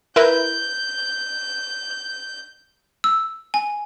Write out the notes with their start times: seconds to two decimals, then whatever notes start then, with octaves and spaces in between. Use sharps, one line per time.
0.16 E4 A#4 B4 G6
3.04 E6
3.54 G#5